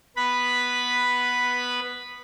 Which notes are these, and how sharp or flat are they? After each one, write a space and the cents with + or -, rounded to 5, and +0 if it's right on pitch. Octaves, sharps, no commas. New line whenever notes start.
B3 -5 B4 +0 B5 +0